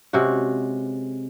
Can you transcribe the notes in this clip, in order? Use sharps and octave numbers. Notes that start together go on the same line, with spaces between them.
C3 G#3 C#4 F#4